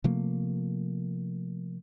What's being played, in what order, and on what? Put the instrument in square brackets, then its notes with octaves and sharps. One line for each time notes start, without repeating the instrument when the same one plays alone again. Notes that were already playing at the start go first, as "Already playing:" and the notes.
[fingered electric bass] C3 F3 A3 A#3